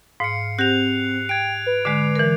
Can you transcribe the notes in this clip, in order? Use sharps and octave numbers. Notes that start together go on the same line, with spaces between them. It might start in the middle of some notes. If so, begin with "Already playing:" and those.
G#2 F5 C7 C#7
C4 G4 F#5 F#6 A#6 F7
G5 G#6 D7
B4
D3 G#3 D6 C7
E3 A#4